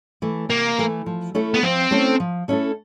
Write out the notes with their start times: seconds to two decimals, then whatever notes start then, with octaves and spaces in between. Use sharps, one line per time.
0.22 E3 A3
0.49 C3 A#3
0.78 E3 A3
1.06 F3
1.35 A3 C#4 E4 A4
1.54 B3
1.62 F3 C4
1.91 A3 C#4 E4 A4
2.20 F3
2.48 A3 C#4 E4 A4